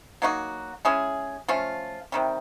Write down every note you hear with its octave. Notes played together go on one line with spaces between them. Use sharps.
F#3 A#3 D#4 F#4
G#3 C#4 E4 G#4
F3 A3 C#4 F4
C3 D#3 G3